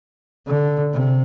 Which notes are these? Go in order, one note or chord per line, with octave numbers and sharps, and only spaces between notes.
D3
C3